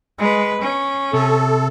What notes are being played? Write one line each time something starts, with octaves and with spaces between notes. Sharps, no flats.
G#3 B4
C#4
C3 A4